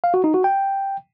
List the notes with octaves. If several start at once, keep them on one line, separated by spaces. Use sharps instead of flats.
F5
F#4
D#4
F#4
G5